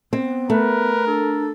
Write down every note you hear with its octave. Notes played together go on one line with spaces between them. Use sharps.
B3 C4
A3 A#4 B4
D4 A4